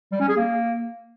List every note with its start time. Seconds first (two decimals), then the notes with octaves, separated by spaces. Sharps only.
0.12 G3
0.20 C#4
0.29 G#4
0.37 A#3